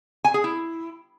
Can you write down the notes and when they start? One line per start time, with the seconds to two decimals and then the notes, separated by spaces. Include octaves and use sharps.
0.24 G#5
0.34 G#4
0.44 E4